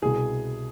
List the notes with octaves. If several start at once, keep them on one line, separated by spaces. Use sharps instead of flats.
C2 B2 G#4